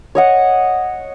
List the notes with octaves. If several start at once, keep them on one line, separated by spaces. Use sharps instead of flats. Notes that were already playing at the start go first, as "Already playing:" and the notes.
C#5 D#5 F#5